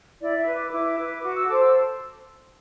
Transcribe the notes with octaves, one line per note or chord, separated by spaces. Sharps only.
E4 D5
E5
B4
D6
E4 D6
B4
F#4 D6
E6
A4 C5 D6
E6